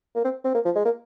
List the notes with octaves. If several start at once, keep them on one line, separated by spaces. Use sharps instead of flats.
A#3
C4
C4
A#3
F3
G#3
A#3